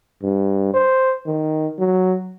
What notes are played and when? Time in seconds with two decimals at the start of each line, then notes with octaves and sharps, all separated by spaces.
0.23 G2
0.74 C5
1.26 D#3
1.79 F#3